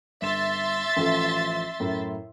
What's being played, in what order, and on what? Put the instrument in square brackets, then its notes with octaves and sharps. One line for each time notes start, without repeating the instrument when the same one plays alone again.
[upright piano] G1 E7 [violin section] E5 C6 A6
[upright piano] A1 F3 A4
F#2 A2 E4